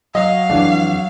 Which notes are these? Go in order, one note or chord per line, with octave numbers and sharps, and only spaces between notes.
F#3 D#5 F5
F2 E3 G#3 D4